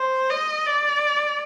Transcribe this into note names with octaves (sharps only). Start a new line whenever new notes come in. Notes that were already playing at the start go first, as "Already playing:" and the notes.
Already playing: C5
D#5
D5